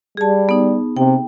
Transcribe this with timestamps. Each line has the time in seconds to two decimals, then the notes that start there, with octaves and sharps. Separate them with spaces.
0.17 G3 G#4 A5
0.49 B3 D#4
0.97 C3 G5